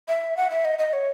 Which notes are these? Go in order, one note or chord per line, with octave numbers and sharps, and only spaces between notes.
E5
F#5
E5
D#5
D#5
C#5